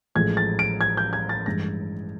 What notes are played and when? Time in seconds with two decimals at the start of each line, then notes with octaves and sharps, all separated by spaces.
0.15 A1 A2 F3 G#3 G#6
0.37 A6
0.59 D7
0.81 G#6
0.97 G6
1.13 G#6
1.29 A6
1.46 G2 E3 G#3 A#6